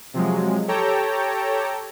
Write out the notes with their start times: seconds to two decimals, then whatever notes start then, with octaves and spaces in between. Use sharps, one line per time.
0.14 C3 F3 F#3 G#3
0.68 G4 A4 C#5 G5 A5 A#5